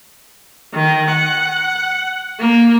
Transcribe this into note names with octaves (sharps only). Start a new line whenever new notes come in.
D#3
F#5
A#3